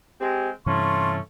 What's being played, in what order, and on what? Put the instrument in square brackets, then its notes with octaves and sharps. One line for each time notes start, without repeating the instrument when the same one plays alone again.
[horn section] G#3 C4 [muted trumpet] G4
[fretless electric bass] G2 C3 E3 [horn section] A3 C#4 F4 [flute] C6 [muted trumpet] C#6